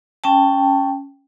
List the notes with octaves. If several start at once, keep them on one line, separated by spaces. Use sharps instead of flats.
C#4 G5 A5